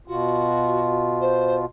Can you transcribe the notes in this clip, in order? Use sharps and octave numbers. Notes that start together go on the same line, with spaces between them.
B2 F4 F#4
C5